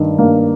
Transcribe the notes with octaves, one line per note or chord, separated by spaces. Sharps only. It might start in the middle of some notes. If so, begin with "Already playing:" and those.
Already playing: G2 D#3
G2 A#3